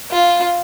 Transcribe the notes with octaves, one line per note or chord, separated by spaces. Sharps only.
F4